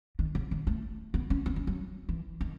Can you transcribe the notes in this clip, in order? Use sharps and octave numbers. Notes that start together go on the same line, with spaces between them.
D#3
C#3
D#3
A3
B3
C#4
B3
C#4
F#3
E3
D#3